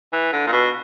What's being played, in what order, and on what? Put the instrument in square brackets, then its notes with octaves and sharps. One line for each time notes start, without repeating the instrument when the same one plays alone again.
[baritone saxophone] E3
D3
A#2
B2